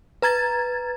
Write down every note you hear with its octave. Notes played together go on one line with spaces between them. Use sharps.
B4 A#5 G#6 A6